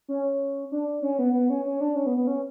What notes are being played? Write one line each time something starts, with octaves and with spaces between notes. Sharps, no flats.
C#4
D4
C#4
B3
B3
C#4
C#4
D4
C#4
B3
B3
C#4